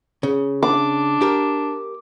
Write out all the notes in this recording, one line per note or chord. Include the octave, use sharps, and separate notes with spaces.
C#3
D4 D6
G4 A#4